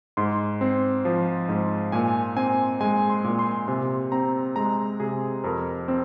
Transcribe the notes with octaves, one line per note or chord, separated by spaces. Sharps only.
G#2 C6
C4
F3
G#2
A#2 G#5
C4 G#5
G#3 G#5
C6
A#2
C6
C3 C6
C4 A#5
G#3 A#5
C3 G#4
F2 A#4
C4